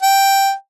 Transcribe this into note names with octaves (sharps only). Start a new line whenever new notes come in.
G5